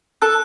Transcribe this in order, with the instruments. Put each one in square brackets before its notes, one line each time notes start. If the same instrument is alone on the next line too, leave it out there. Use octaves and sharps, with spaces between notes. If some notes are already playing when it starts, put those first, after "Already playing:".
[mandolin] A4 [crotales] F#6